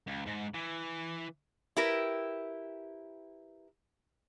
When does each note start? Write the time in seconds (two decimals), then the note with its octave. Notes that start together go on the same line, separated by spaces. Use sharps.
0.07 C#2
0.26 G#2
0.54 E3
1.77 E4 G4 A#4 B4